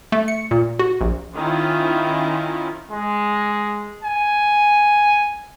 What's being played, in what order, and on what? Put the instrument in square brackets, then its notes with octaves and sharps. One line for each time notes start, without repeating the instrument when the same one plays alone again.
[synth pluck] A3
C#7
A#2
F#4
A#1
[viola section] D#3 C#4 E4 F4
[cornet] G#3
G#5